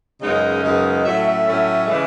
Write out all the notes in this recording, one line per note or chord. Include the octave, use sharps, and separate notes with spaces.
F#2 C#3 G#3 B3 D#4 D#5
F#2 C#3 G#3 B3 D#4
A2 F#3 A3 C#4 E5
E5
A2 F#3 A3 C#4
C#3 E3 G#3